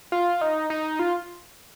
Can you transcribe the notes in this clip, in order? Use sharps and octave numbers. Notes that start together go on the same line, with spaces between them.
F4
D#4
D#4
F4